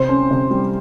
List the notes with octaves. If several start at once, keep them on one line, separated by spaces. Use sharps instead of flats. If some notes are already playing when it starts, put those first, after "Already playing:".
Already playing: C3 C5
C#4
C3
G3